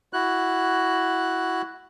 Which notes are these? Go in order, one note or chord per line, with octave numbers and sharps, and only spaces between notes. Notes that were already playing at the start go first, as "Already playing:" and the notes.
E4 F#4 F#6